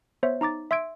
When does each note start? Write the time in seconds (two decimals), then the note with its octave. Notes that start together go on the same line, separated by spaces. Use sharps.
0.23 B3 C5 C#5 E5
0.41 D#4 A#5 D6 A6
0.71 E5 C6 E6 G#6 D7